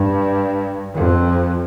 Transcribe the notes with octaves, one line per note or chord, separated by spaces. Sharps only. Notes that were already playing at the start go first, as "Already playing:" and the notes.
Already playing: G2
F2